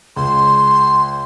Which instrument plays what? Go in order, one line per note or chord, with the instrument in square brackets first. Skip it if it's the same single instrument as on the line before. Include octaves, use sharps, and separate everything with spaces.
[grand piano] C#2 [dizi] C6